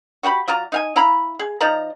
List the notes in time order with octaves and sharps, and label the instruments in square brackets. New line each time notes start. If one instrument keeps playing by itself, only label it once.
[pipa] F#4 G4 F#5 B5
F#3 F4 D5 A#5
D#4 F5 G#5
E4 F5 A#5 B5
G#4
F3 D#4 D5 A#5